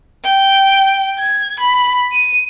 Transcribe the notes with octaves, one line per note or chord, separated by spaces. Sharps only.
G5
G#6
B5
D#7